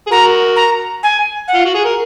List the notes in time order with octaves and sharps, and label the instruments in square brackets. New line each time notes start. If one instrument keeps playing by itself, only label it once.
[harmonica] G#4
[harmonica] F#4 A#4 [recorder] A#5
[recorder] A#5
G#5
F#5
[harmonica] F4
F#4
G#4
A#4